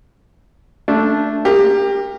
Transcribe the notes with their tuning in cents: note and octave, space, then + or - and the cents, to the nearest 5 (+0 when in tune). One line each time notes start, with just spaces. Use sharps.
A3 +0 D4 -10
G4 +25 A#4 -5